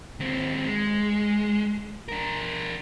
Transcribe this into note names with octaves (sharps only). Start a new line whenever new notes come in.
D#2 C4
G#3
D4 A#4